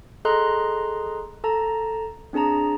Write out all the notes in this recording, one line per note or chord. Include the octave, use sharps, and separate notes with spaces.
G#4 A4 D#5 A#5 C6 F#6
A4 A5 A#5
C4 D4 G#4 A5 A#5